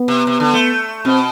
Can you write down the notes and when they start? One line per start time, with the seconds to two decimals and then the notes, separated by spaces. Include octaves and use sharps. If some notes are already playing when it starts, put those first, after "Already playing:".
Already playing: B3
0.08 C3
0.27 C3
0.40 D3
0.54 A3
1.05 B2 C4